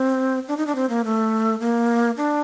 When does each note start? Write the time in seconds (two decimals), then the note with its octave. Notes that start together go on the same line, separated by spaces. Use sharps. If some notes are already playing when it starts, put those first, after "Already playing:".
Already playing: C4
0.48 D4
0.57 D#4
0.67 D4
0.75 C4
0.89 A#3
1.05 A3
1.60 A#3
2.17 D4